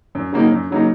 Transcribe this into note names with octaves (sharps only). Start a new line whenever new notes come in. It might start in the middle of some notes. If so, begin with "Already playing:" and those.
F#2
C#3 F#3 A#3 D#4
F#2
C#3 F#3 A#3 D#4